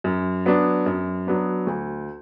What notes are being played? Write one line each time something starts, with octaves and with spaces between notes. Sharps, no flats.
F#2
F#3 B3 D4
F#2
F#3 B3 D4
D2